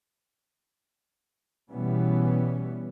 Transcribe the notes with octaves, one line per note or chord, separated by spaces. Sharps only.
B2 E3 G3 B3 C#4